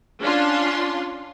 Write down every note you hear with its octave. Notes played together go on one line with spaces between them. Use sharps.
C#4 D4 F4 C6